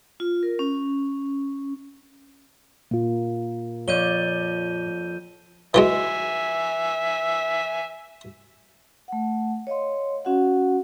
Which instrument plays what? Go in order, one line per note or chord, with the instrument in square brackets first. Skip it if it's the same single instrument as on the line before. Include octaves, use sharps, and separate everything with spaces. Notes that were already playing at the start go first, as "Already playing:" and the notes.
[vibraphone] F4
A#4
C#4
[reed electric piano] A#2 F4 [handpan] A#3
[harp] F2 [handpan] C#5 D5 [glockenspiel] G6 D#7 G7
[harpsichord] E3 F#3 G#3 [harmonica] E5 G#5
[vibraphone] A3 F#5
C#5 D#5 F5 C6
C#4 F#4 F5 F#5